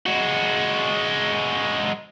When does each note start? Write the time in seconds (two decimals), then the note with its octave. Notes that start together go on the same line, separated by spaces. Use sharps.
0.06 G#3 F#4